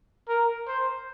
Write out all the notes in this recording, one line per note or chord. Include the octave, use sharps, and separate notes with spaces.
A#4
C5